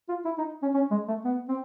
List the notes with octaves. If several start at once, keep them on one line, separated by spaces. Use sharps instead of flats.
F4
E4
D#4
C#4
C#4
G#3
A3
B3
C4